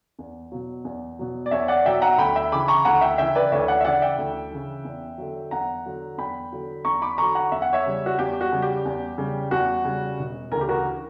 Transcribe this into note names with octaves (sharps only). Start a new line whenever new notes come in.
E2
B2 F#3
E2
B2 F#3
D5
E2 C#5 E5
D5 F#5
B2 F#3 E5 G5
F#5 A#5
D2 G5 B5
E5 G5
C#3 E3 B5 D6
A#5 C#6
D2 F#5 A#5
E5 G5
C#3 E3 E5 G5
B4 D5
D2 C#5 E5
D5 F#5
E5
C#3 E3 D5 F#5
E5 G5
D2
C#3 E3
E2
D3 F#3
E2 F#5 A#5
D3 F#3
E2 G5 B5
D3 F#3
E2 A#5 C#6
B5 D6
D3 F#3 A#5 C#6
F#5 A#5
E2 E5
F#5
C#5 E5
C#3 G3
F#4
E2 G4
F#4
C#3 G3
G4
E2
C#3 G3
E2 F#4
C#3 G3
E1
D2 C#3 E3 A#4
G4
F#4 A#4